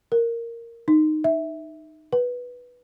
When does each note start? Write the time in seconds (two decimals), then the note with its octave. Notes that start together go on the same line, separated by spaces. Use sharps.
0.12 A#4
0.88 D#4
1.24 E5
2.13 B4